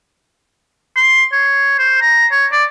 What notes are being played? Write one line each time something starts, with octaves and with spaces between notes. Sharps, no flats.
C6
C#5
C5
A#5
C#5
D5